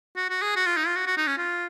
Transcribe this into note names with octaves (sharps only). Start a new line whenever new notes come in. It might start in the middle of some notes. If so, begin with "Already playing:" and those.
F#4
F#4
G#4
F#4
F4
D#4
F4
F#4
F#4
D#4
C#4
F4